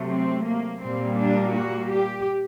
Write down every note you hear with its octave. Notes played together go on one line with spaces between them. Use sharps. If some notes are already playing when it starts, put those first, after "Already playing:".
Already playing: C3 F#3 A3
C4
A#3
A#2 G3 A#3 C4
D4
F#4
G4